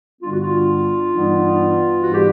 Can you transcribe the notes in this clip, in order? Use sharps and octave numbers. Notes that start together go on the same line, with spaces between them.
G2 D3 G3 B3 D4 F4
F#4
F4
G2 E3 G3 B3 D#4
G#2 E3 G3 B3 F#4
G4